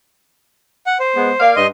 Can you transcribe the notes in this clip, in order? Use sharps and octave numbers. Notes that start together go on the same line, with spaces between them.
F#5
C5
G#3 B3
A#3 D5 F5
G2 D#5 C6